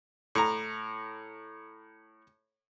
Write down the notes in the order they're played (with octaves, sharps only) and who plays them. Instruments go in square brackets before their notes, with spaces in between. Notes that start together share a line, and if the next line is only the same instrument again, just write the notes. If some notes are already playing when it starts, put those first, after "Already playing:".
[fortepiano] A2 A#5